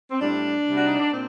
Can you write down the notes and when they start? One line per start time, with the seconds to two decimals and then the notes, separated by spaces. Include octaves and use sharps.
0.10 C4
0.20 A2 G3 D4
0.66 C3 G3
0.74 F#4
0.87 D#4
0.99 D4
1.12 A#2 C4